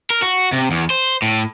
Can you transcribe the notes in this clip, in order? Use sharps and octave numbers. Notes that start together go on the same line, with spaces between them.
A#4
F#4
C3
E2
C5
A2